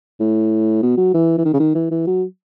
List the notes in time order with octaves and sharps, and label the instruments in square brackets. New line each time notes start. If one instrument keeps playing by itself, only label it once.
[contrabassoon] A2
B2
F#3
E3
E3
D#3
C#3
D#3
E3
E3
F#3